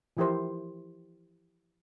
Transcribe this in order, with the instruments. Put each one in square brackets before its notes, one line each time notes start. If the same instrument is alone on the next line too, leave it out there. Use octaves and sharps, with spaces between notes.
[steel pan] E3 F3 E4 G4 A#4 C5